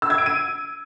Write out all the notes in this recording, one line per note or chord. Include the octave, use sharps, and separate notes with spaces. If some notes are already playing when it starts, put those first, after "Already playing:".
E6
G#6
D7
D#7